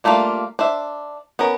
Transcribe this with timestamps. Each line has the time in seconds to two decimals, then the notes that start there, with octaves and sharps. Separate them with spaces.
0.04 G3 A3 A#3 D4 F4
0.59 D4 C5 E5
1.39 B3 C#4 A#4